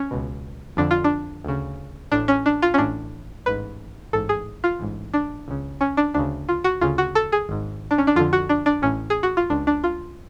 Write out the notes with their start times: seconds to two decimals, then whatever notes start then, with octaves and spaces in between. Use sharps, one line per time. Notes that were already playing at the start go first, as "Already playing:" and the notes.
Already playing: C#4
0.11 C#2 B2
0.77 F2 D3 D4
0.91 F4
1.04 D4
1.45 D2 C#3
2.12 A1 A2 D4
2.28 C#4
2.46 D4
2.62 F4
2.74 C#4
2.78 A1 A2 D4
3.46 A1 G#2 B4
4.13 A1 G#2 A4
4.29 G#4
4.64 F4
4.80 A1 G#2
5.14 D4
5.48 C#2 C#3
5.81 C#4
5.97 D4
6.14 D2 C#3 D4
6.49 F4
6.64 F#4
6.81 D2 C#3 F4
6.98 F#4
7.15 A4
7.32 G#4
7.49 G#1 G#2
7.91 D4
7.98 C#4
8.07 D4
8.16 F2 D3 F4
8.33 F#4
8.49 D4
8.66 D4
8.82 A1 A2 C#4
9.10 G#4
9.23 F#4
9.37 F4
9.50 C#2 C#3 D4
9.67 D4
9.84 F4